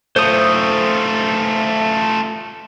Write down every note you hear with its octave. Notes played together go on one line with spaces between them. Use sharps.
A3 F4 C5 D#6